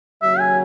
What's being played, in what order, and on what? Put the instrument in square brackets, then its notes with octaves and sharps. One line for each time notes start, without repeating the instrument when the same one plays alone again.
[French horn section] D#2 C#3 F#3 [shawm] E5
[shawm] G#5